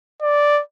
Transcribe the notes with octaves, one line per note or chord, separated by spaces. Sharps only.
D5